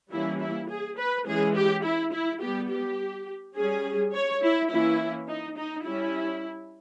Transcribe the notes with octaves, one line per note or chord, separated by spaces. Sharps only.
E3 G3 A#3 C#4 E4
E4
G#4
B4
E3 G#3 C#4 G#4
G4
E4
E4
G3 B3 G4
G4
G3 C#4 G#4
C#5
E4
E3 A#3 C#4 E4
D#4
D#4
G3 C#4 E4